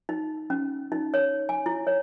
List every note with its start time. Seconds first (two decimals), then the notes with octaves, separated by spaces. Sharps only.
0.09 D#4
0.50 C#4
0.92 D#4
1.14 C#5
1.49 G#5
1.66 E4
1.87 C#5